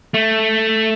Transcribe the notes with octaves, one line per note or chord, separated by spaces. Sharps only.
A3